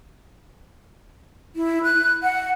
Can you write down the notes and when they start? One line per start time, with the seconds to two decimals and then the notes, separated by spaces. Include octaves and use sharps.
1.56 E4
1.84 F#6
2.23 F#5